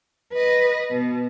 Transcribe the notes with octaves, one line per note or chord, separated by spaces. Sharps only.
B4 D#5
B2